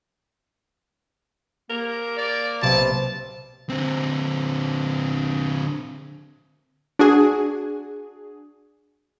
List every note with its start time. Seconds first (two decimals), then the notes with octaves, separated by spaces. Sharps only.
1.70 A#3 A#4
2.18 D5
2.62 B1 C3 A5
3.69 D3 C4
6.99 D4 F#4 G#4